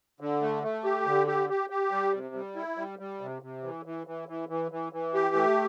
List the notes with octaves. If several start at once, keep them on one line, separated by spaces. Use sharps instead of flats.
D3
A3
A3
G4
D3
G4
G4
G4
G3
C3
G3
E4
G3
G3
C3
C3
E3
E3
E3
E3
E3
E3
E3
G4
A3